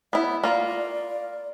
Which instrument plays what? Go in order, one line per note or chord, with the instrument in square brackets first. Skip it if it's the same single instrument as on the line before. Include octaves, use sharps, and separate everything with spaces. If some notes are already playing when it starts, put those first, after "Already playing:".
[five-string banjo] B3 E4 [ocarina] E5
[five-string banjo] A#3 F4 [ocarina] D5